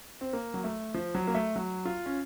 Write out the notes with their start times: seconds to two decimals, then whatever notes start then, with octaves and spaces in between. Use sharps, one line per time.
0.21 C4
0.33 A#3
0.54 F#3
0.64 A3
0.94 F3
1.15 F#3
1.27 A#3
1.35 A3
1.56 F#3
1.85 F4
2.06 C#4